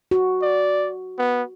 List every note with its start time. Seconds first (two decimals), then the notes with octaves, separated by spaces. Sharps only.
0.11 F#4
0.42 D5
1.18 B3